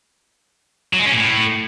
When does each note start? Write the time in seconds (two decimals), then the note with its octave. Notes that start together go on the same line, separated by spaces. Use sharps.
0.93 F#3
0.99 G#3
1.05 C#4
1.11 A#2
1.18 A2